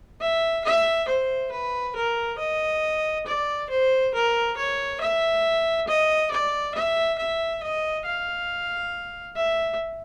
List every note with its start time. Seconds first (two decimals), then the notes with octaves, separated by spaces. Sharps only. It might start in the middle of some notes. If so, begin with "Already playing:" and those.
0.21 E5
0.65 E5
1.08 C5
1.52 B4
1.96 A#4
2.39 D#5
3.27 D5
3.70 C5
4.14 A#4
4.57 C#5
5.01 E5
5.88 D#5
6.31 D5
6.75 E5
7.18 E5
7.63 D#5
8.06 F5
9.37 E5